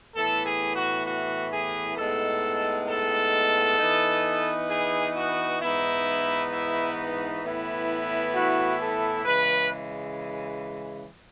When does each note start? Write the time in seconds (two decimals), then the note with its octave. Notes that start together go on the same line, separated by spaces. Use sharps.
0.15 A2 E3 B3 A4
0.46 G#4
0.76 F#4
1.06 F#4
1.52 G#4
1.97 A2 G#3 B3 D#4 A4
2.88 A4
3.79 E3 B3 D#4
4.70 G#4
5.16 F#4
5.62 G#2 E3 B3 D#4 E4
6.52 E4
7.44 A2 E3 B3 E4
8.35 F#4
8.80 A4
9.25 C#3 E3 G#3 B4